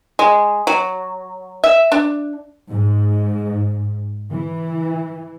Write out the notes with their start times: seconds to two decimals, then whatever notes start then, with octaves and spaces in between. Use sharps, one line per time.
0.19 G#3
0.67 F#3
1.64 E5
1.92 D4
2.70 G#2
4.31 E3